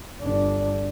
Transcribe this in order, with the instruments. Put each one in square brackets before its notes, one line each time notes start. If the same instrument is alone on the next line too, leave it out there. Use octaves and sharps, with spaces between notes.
[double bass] G1 D4